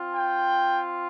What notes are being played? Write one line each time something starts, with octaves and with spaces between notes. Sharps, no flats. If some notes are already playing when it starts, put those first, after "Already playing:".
Already playing: C4 F4
G5